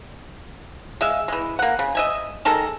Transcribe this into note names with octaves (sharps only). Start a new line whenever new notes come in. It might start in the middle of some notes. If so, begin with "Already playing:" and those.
G#3 E5 F5
E3 G#3
A#3 F#5
C#3
D#5 E5 G#5
D#3 G#3 A4 A#4